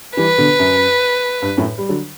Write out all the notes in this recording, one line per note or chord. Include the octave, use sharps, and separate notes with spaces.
E3 G3 B4
B2 D3
F#2
G2
F#2 A2
G3
D3 F#3